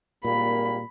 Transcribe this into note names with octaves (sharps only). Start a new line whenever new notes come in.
G#1 A#2 G3 A#3 B5